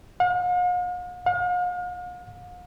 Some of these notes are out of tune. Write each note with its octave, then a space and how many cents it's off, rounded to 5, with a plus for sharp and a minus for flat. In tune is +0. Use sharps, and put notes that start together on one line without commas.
F5 +45
F5 +40